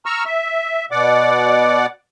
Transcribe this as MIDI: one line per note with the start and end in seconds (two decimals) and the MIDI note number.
0.06 0.24 82
0.06 0.24 85
0.06 0.24 88
0.06 0.24 89
0.26 0.85 76
0.91 1.86 47
0.91 1.86 74
0.91 1.86 78
0.91 1.86 86